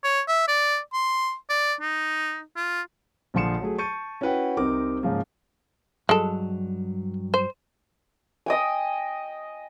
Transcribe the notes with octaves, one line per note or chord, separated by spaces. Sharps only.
C#5
E5
D5
C6
D5
D#4
F4
A#1 D3 F3 C6 C#7 E7
F#3 A3 G#4
A5 C#6 G6 A6 C#7 D#7
C#4 E4 F#4 B4 F#5 G5
C2 C3 C4 D#4 A#4 D6
G#2 C#3 F3 G#3 A#3
G2 F#3 G#3 A4
C5
D#5 G5 G#5